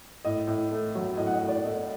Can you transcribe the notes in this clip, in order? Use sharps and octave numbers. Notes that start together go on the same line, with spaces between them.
A2 D#5
A2
A3
F#3
A2 D#5
F#5
D#5
A2
D5
A3 D#5